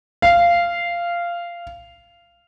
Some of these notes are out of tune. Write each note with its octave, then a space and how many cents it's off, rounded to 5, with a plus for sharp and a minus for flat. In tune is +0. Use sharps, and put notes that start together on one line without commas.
F5 -15